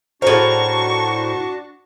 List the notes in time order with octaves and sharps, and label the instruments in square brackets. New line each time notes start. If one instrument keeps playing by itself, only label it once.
[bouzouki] A2 A#4 [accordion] D4 F#4 A5 [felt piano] G#4 C5 [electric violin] C#6